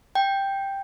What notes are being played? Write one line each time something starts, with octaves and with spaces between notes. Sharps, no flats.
G5